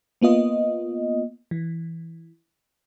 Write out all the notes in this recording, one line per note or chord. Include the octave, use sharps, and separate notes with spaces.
A#3 B3 F4 D#5
E3